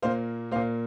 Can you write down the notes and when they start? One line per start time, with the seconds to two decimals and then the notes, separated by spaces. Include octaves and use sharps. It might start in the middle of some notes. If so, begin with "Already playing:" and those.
0.02 A#2 A#3 C5 F5
0.51 A#3 C5 F5
0.56 A#2